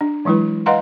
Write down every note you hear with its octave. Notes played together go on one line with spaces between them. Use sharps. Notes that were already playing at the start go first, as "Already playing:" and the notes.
D4
E3 F#3 G#3 E4 B4
B4 D#5 F5 F#5 A#5 C6